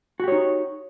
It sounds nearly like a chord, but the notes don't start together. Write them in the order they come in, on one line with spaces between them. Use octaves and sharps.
F#4 G4 C#5 D#4